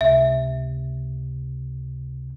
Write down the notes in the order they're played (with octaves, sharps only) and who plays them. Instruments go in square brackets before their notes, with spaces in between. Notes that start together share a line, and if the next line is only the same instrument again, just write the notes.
[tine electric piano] C#2 C3 [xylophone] E5